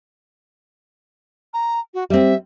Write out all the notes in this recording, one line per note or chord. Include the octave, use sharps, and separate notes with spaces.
A#5
F#4
G3 C4 E5